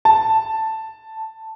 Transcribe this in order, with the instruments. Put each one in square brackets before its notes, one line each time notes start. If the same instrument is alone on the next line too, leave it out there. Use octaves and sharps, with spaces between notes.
[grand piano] A5